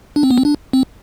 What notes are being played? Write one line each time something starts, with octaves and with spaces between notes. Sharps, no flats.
D4
C4
B3
C4
D4
C4